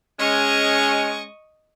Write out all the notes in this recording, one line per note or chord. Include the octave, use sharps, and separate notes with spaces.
G#3 C#4 D#5 C#6